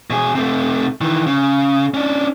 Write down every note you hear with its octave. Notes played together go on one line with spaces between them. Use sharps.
B2 G#4
C3 A3
D#3 E3
C#3
C#4 D4